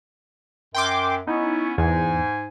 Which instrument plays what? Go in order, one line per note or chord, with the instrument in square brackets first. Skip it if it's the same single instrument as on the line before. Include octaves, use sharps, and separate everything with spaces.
[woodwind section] F#2 [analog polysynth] G5 C6 D6
[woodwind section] B3 C#4 E4 [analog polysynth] D#4
[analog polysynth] E2 [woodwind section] G#2 G#5